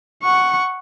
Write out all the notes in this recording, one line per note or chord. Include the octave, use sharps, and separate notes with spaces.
F#5 C#6